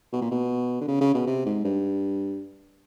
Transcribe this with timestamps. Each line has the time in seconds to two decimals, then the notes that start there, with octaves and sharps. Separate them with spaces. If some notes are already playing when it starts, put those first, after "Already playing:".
0.13 B2
0.21 A#2
0.31 B2
0.81 D3
0.88 C#3
1.01 C#3
1.14 B2
1.27 C3
1.46 G#2
1.65 G2